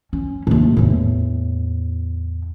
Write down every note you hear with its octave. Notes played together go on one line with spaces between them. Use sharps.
C#4
D#2 A2
E2 A2